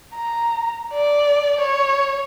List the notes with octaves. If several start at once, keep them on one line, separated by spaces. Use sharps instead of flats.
A#5
D5
C#5